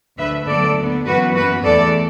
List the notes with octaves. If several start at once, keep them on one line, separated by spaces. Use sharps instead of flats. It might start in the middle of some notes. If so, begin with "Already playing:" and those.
D2 D3 A3 B4 E5
D2 D3 F#3 B3 A4 D5
D2 D3 B3
F#2 E3 B3 F#4 B4
F#2 E3 B3 F#4 B4
E2 E3 A3 A4 D5